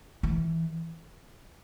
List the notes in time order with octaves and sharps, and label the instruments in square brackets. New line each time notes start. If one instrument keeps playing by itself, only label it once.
[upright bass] E3